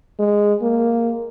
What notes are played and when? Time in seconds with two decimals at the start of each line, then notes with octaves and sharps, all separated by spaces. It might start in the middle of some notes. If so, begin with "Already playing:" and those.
0.19 G#3
0.62 A#3